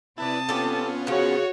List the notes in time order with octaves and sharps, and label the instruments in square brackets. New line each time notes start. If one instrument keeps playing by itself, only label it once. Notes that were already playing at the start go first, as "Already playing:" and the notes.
[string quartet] C3 A5 D#6 [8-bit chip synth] E4 B4 D5
[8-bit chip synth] B3 C#4 F4 [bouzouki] G4 A4
[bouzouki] C#3 F3 [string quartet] F#4 C#5 F#5